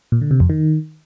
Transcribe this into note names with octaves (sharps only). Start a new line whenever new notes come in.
A#2
D3
C3
F2
D#3